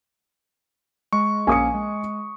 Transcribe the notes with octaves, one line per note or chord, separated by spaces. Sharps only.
G#3 C#6
A#1 A#3 C#4 G#5 D#6 C#7
G#3